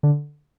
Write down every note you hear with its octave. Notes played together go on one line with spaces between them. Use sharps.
D3